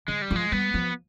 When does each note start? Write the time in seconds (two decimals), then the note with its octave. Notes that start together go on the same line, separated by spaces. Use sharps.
0.08 D3 G#3
0.22 G3
0.31 F3 G#3
0.52 G3 B3
0.74 F3